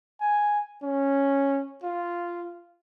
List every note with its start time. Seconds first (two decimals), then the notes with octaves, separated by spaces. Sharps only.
0.21 G#5
0.83 C#4
1.83 F4